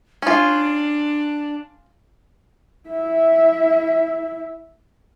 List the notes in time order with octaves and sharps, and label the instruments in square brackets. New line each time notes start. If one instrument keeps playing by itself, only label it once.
[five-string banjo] C#4 F4 [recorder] D4
[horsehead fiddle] E4 E5